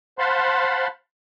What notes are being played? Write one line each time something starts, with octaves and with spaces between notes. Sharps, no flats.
C5 F5 F#5 A5 B5 C6